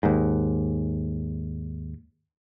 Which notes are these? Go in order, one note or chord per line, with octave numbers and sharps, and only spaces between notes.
D#2 G#2